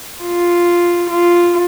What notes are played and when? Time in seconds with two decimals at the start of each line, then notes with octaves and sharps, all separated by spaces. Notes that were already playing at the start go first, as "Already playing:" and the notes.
0.22 F4
1.10 F4